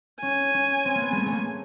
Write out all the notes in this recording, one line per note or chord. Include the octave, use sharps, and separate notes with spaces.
C#4 G#5
C#4
C4
A#3
B3
G#3 A3
A3
A#3